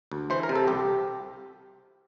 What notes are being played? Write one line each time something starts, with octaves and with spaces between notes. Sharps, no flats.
D2
E3 C5
A#4
C3
A4
C2 G4